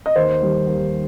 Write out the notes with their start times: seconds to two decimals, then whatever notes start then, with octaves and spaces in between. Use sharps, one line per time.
0.06 D#5
0.16 D#2 C5
0.42 D#3 G3
0.67 D#2